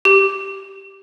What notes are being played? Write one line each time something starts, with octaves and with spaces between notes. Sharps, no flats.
G4